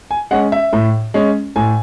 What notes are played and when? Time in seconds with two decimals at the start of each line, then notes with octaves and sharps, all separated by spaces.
0.11 G#5
0.31 G#3 C#4 F#5
0.52 E5
0.73 A2
1.14 G#3 C#4
1.56 A2 G#5